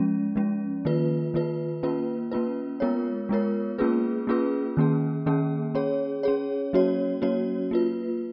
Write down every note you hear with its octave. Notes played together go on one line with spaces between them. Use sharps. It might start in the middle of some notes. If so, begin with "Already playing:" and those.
Already playing: F3 G#3 C#4
F3 G#3 C#4
D#3 A#3 F4 B4
D#3 A#3 F4 B4
A#3 C#4 F4 B4
A#3 C#4 F4 B4
G#3 B3 F4 A#4 C#5
G#3 B3 F4 A#4 C#5
A#3 C#4 F4 G#4 B4
A#3 C#4 F4 G#4 B4
D#3 A#3 C#4 G#4
D#3 A#3 C#4 G#4
C#4 G#4 C#5
C#4 G#4 C#5
F#3 A#3 C#4 F#4 C#5
F#3 A#3 C#4 F#4 C#5
A#3 F4 B4